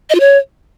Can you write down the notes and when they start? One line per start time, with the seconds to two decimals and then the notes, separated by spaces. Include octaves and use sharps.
0.10 D#5
0.15 F4
0.20 C#5